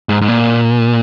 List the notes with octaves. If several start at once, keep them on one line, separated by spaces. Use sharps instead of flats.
G#2
G#2
A#2